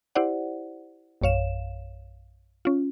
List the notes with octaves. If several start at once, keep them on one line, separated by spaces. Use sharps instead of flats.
E4 G4 C5 D5 F#5
A#1 F#2 C#5 F5 E7
C#4 F4